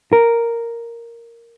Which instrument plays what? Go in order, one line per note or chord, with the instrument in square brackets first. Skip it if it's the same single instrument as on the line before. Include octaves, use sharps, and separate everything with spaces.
[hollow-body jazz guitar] A#4